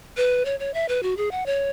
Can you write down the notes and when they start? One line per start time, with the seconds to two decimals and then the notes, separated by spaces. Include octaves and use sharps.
0.17 B4
0.45 C#5
0.60 C#5
0.74 E5
0.89 B4
1.03 F#4
1.17 G#4
1.31 F#5
1.46 C#5